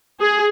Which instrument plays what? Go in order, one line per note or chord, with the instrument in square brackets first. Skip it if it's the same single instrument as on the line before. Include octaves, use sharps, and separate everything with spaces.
[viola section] G#4